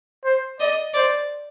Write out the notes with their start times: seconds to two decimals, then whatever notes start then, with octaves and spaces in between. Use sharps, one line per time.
0.25 C5
0.60 D5 D#5
0.94 C5 D5